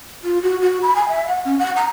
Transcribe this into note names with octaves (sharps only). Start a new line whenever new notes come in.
F4
F#4
F#4
B5
G#5
E5
F#5
C#4
F#5
A#5